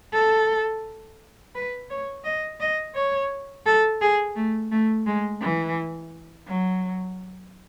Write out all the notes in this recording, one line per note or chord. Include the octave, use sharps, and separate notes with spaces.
A4
B4
C#5
D#5
D#5
C#5
A4
G#4
A3
A3
G#3
E3
F#3